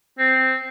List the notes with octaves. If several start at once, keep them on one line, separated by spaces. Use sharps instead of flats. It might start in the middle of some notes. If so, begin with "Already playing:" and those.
C4